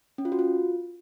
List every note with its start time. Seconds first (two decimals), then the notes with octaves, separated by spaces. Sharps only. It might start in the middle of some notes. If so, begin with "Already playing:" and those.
0.18 C#4
0.25 F4
0.32 F#4
0.39 F4